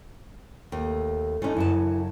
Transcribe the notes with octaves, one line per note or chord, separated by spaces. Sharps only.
D#2 A3
D3 E3 A3 C#4 D#4
F#2 C#3 A5